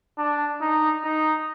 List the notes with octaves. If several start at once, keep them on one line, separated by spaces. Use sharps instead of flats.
D4
D#4
D#4